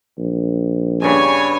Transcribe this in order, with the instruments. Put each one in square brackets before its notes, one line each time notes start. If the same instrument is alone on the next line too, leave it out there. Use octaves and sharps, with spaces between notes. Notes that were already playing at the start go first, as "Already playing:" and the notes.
[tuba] A#1
[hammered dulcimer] G2 C#3 B5 [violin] C#5 G#5